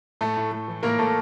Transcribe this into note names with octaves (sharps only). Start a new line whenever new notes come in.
A2 A3 A4
A2
A3
E3
A2 A#3 A#4
A2 A3 A4